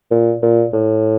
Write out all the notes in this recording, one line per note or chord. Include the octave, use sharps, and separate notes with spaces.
A#2
A#2
A2